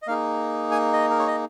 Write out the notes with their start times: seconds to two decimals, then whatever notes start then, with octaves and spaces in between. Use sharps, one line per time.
0.02 D#5
0.07 A#3 D#4 G#4 F5
0.72 G#5
0.93 D#5
1.10 A#4
1.19 C#5
1.27 D#5